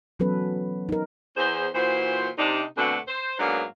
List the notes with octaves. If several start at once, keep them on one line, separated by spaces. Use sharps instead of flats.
E3 F#3 B3 C#4 A4 B4
D#4 A#4
E2 G#4 C5
A#2 E3 F#4 C5
C3 D4 D#4
D2 B2 D3 A3 C4 F#5
C5
G#2 F#3 A#3 B3 D4 F5